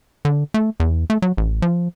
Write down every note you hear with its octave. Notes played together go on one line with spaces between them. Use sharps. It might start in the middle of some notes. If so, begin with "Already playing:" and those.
D3
A3
E2
A3
F#3
A1
F3